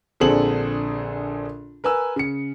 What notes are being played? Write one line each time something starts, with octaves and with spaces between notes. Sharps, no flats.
A#1 D3 C4 G#4 A4 F#7
A#4 B4 G#5 E6
C#3 C#7